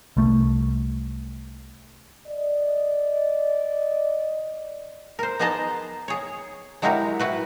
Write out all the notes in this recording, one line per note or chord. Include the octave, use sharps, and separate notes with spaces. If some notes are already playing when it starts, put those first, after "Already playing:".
C2 A3
D5 D#5
A#4 C5
B3 D#4 G#4 D#5 A5 A#5
G#4 C#5
F#3 G#3 E4 F#4 G4 A#4
E4 F#4 B4